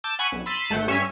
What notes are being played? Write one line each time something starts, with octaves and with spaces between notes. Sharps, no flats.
A5 D6 E6 G6 A6
F#5 G#5 B5 C#6 E6 F#6
B1
B5 C6 E6 A6 B6 D#7
G#1 A3 F#5 G6
G2 C#4 C#5 E5 D#7